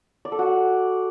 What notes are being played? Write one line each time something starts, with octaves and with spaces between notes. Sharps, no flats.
D5
A4
F#4